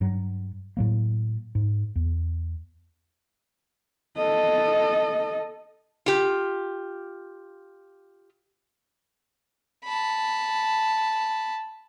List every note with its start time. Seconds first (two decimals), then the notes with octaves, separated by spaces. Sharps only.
0.01 G2 F#3
0.77 A2 F#3 A#3
1.55 G#2
1.96 E2
4.18 A4 D#5
6.06 F4 G4
9.85 A5 B5